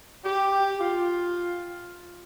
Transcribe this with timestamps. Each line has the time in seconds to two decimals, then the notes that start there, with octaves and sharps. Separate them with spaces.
0.24 G4
0.79 F4